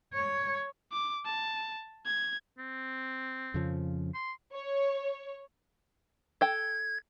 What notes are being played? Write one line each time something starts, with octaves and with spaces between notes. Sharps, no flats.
C#5
D6
A5
G#6
C4
F2 C#3 F3
C6
C#5
A4 G5 G#6